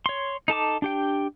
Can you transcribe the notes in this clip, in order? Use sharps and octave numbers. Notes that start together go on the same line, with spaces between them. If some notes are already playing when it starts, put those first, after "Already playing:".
C#5 C6
D#4 A4 A5 D6
D4 G4 G5